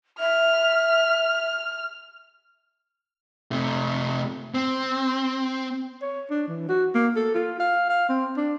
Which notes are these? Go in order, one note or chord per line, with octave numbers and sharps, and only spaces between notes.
E5 F6
C3 A3
C4
C#5
D4
E3
F#4
A#3
A4
F4
F5
F5
C4
D4